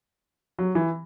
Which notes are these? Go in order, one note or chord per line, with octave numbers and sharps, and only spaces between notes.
F#3
E3